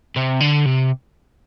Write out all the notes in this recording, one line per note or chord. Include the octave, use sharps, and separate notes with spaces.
C3
D3
C3